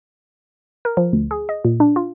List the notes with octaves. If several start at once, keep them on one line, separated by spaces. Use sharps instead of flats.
A#4
F3
D2
G#4
D#5
A#2
D4
F4